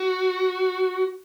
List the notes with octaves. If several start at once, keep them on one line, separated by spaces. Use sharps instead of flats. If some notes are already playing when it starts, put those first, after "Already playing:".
Already playing: F#4